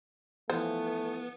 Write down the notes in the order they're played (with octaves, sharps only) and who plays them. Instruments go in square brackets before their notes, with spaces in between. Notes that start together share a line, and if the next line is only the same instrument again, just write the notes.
[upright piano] E3 F3 [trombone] A3 [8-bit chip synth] B3 [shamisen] C5